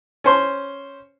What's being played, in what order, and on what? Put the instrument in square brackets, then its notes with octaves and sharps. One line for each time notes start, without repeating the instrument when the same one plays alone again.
[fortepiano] C#4 C5 C6